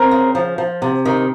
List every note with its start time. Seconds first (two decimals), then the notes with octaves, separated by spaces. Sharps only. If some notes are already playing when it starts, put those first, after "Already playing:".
Already playing: C4 A#4
0.11 C#3
0.35 F3
0.58 F3
0.82 C3
1.05 D#3